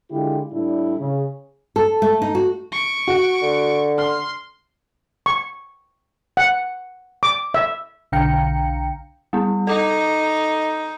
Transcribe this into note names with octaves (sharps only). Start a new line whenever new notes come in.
D3 G#3 E4 F4 G4
A2 G3 D4 E4
C#3
A4
A3
D#4
F#4
C#6 D7
F#4
D3
C6 F6
C#6
F#5
D6
E5
B1 D3 F5 G5 A#5 C#7
G3 B3
D#4 A4 D6